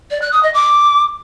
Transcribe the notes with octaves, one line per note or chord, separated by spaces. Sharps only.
D5
F#6
D#6
D#5
D6